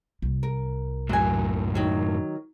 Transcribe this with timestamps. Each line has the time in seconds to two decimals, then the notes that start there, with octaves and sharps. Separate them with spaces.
0.22 C2
0.43 A#4
1.09 F#2 A2 F#3 G#5
1.75 D#3 F#3